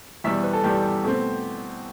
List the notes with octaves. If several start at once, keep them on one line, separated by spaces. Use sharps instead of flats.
E2 B2 G3 E5
B4
A4
E2 B2 G3 G4
B2 A3 C4